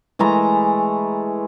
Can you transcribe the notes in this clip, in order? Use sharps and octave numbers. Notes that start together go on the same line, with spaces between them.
E3 G#3 A3 A#5